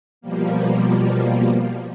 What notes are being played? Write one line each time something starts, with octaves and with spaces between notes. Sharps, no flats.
B2 F3 G3 A#3